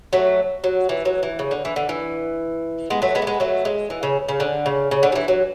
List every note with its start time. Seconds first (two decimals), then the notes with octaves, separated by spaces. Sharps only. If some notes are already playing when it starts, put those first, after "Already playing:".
0.13 F#3 A3
0.64 F#3
0.89 E3
1.05 F#3
1.23 E3
1.39 C#3
1.51 D3
1.65 E3
1.76 D3
1.89 E3
2.90 G#3 B3
3.02 F#3 A3
3.15 G#3 B3
3.22 A3
3.27 G#3 B3
3.40 F#3 A3
3.65 G#3
3.90 E3
4.03 C#3
4.29 C#3
4.40 D3
4.66 C#3
4.91 C#3
5.03 D3
5.12 F#3
5.15 E3
5.28 F#3